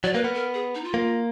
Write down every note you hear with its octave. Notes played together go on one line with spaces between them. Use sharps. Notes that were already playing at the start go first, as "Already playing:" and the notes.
F#3 D5
A#3 B4
B3 A#4
A#4
G#4
D#4
F4
A#3